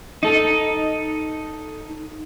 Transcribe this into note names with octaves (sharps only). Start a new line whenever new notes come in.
D#4 A4